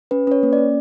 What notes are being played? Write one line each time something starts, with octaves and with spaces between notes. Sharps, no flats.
C#4 B4
C#4 B4 C#5
A#3
D5
C#4